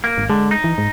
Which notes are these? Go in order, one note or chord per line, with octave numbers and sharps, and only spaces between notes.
A#3
G#1
D3 G#3
D#4
E3
G#2